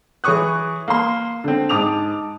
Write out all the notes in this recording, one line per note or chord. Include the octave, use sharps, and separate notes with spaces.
E3 G#4 C#5 C#6 D#6 F#6
A#3 C6
D3 C4
G#2 A5 D6 D#6 F7